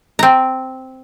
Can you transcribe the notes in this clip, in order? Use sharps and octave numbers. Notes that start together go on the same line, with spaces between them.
C4 A#5